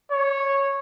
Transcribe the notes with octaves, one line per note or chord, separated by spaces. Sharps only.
C#5